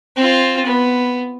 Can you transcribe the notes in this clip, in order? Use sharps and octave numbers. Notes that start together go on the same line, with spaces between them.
C4 F4
B3